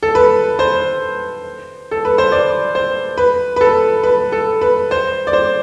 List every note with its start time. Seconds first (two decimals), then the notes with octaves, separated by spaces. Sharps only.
0.03 A4
0.15 B4
0.59 C5
1.91 A4
2.05 B4
2.18 C5
2.32 D5
2.75 C5
3.18 B4
3.56 B4
3.61 A4
4.03 B4
4.32 A4
4.61 B4
4.91 C5
5.27 D5
5.33 C5